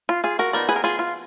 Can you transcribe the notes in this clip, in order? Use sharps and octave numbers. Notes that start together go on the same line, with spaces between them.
F4
F4 G#4
F#4 A#4
F3 B3 D#4 A#4 D5
G#4 B4
A#4
F4 G#4
F4